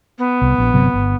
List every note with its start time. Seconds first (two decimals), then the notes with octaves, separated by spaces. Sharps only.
0.18 B3
0.42 C2
0.58 A#1
0.73 G1 C3 F#3
0.94 G1